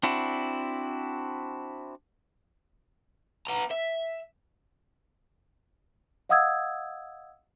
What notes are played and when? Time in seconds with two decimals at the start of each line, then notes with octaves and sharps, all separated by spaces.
0.03 C4 D4 E4 F#4
3.47 B3 A#5
3.71 E5
6.29 D#5 F5 F#5 D#6 E6 G#6